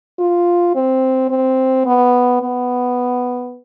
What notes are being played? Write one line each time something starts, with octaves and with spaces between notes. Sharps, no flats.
F4
C4
C4
B3
B3